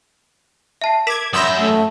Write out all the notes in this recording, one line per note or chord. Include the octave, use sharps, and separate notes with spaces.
E5 A5 C7
A#4 D6 G#6 B6 E7
F#2 E5 B5 C6 D#6 E6 G6 A#6
A3